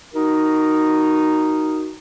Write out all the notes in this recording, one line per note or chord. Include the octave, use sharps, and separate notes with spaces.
D#4 F#4 A#4